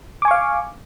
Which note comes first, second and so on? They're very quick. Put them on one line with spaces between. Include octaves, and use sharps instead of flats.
D6 G#5 C#6 F5